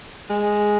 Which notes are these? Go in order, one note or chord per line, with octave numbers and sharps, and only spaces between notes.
G#3